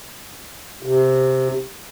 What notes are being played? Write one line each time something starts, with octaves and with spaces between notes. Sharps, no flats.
C3